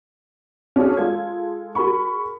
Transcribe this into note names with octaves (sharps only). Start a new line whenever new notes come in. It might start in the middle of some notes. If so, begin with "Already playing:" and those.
C#4 D4 F#4 G#4
G#3 F4 A4 G#6
F#4 G#4 A#4 B5 C#6